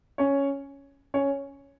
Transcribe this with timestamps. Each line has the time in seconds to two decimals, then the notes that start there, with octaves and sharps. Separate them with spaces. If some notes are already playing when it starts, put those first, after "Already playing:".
0.18 C#4 C#5
1.14 C#4 C#5